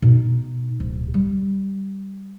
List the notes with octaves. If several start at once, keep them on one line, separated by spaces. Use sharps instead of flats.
B2 D#4
D1
G3